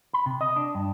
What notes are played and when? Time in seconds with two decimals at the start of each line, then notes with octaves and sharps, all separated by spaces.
0.13 B5
0.26 C3
0.41 D#5
0.56 D4
0.75 G2